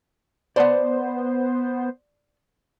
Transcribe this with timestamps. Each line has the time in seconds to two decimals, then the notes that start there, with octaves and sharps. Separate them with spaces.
0.56 B3 C5 D5 A5 C6